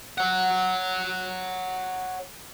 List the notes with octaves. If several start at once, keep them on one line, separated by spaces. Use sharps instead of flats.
C#5 F#5